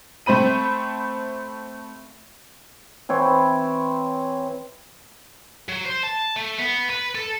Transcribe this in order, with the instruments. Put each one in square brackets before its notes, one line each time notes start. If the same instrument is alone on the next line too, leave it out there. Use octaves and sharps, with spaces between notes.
[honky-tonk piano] A3 C4 C5 B5 D#7
[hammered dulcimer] E3 C4 C#5
[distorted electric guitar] F#3
C5
A5
A3
B3
B4
A4